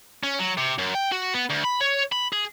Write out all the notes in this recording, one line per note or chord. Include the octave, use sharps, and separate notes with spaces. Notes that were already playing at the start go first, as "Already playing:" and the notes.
C#4
F#3
C3
F#2
G5
F#4
B3
D2
B5
C#5
B5
G#4